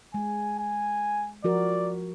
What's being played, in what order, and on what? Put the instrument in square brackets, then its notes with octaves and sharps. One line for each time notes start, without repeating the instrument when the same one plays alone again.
[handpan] G#3 [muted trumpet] G#5
[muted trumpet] G#5
[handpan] F3 F#4 A#4 [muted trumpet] D5